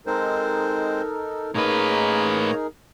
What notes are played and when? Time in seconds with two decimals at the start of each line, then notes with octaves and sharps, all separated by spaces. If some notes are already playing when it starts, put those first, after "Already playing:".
0.06 G#3 C4 D#4 A4 A#4 C5
1.54 A2 A#3 D#4 G#4 A#4 B4 C#5 A#5